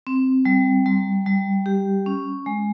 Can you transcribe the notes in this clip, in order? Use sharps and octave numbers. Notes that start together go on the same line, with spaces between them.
C4
G3
G3
G3
G4
C#4
G#3